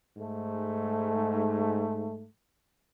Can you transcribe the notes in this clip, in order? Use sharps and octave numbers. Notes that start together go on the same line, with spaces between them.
G#2 A3